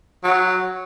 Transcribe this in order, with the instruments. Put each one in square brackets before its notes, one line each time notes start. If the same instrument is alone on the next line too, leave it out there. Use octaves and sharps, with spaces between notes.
[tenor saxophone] F#3